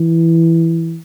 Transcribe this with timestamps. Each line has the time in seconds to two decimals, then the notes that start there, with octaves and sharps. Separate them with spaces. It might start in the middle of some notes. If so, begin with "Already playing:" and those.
Already playing: E3